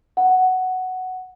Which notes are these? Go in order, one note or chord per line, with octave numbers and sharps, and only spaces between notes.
F#5